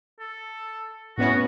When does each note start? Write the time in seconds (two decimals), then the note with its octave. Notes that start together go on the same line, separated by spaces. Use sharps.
0.20 A4
1.18 A2 B3 C#4 F#4